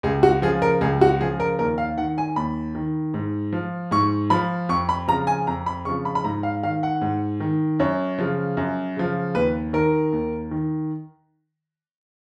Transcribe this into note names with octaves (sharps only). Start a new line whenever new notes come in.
C#2 G#4
F#4
C#3 F3 G#4
A#4
C#2 G#4
F#4
C#3 F3 G#4
A#4
D#2 A#4
F5
D#3 F#5
G#5
D#2 B5
D#3
G#2
F3
G#2 C#6
F3 B5
F2 C#6
B5
C#3 F3 A#5
G#5
F2 A#5
B5
C#3 F3 C#6
B5
B5
G#2 A#5
F5
D#3 F5
F#5
G#2
D#3
F#2 C#5
C#3 F3
F#2
C#3 F3
D#2 B4
D#3 A#4
D#2
D#3